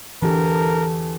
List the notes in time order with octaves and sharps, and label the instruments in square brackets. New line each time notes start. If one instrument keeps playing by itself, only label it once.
[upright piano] E2 D3 [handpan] E3 G4 [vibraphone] A4 A5 [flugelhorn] A#4